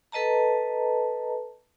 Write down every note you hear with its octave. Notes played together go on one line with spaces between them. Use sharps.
A4 B4 D#5 A5 A#5